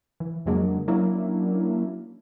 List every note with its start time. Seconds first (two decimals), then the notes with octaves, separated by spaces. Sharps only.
0.20 E3
0.46 F2 C#3 F#3 G#3 A#3 D4
0.88 F#3 A#3 C#4 D4 E4